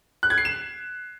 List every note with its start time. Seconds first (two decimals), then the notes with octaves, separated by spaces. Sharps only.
0.23 F#6
0.30 G#6
0.38 C7
0.45 E7